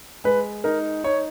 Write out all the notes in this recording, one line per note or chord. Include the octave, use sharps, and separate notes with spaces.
G#3 B4
D#4 A#4
D#4 C#5